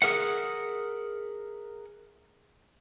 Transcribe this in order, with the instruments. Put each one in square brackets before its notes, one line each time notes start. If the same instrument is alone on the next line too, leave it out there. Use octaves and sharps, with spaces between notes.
[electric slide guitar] G#4 A#4 E5 F#5